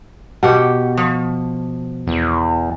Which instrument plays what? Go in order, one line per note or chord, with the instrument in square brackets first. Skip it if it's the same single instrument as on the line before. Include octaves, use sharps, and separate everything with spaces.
[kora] B2 [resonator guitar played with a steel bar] G4 F#5
[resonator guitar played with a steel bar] F3
[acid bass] E2